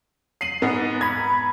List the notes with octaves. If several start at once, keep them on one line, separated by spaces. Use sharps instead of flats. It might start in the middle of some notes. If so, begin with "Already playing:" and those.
C7 D#7 F#7
G#2 B3
A#5 B5 G#6